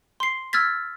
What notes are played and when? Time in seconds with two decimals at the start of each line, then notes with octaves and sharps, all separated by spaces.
0.20 C6 C7
0.53 E6 F6 G#6 A6 B6